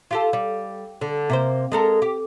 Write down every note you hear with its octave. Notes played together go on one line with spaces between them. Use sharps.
F4 G4 A4
G3
D3
C3 A#3 C5
G#3 A4 A#4
G4